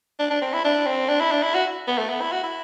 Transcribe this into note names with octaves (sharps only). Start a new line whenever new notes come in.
D4
D4
C4
E4
D4
C4
D4
E4
D4
E4
F#4
B3
A3
B3
E4
F#4
E4